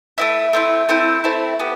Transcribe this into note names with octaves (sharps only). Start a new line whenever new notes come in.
A3 C4 E4
A3 C4 E4
A3 C4 E4
A3 C4 E4
B3 G4